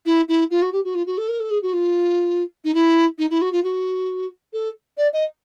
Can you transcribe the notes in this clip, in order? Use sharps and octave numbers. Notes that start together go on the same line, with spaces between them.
E4
E4
F4
F#4
G4
F#4
F4
F#4
A4
A#4
A4
G#4
F#4
F4
D#4
E4
D#4
E4
F#4
F4
F#4
A4
D5
D#5